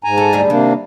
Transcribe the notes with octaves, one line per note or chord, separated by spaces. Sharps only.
G#2 G#5 A#5
A4
D2 G3 G#4
C3 D#3 A#3 D4